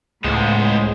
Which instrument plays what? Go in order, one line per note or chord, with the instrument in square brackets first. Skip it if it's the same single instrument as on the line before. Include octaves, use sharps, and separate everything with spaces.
[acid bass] C#2 [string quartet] A2 [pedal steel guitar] G#3 [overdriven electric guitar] B3 C5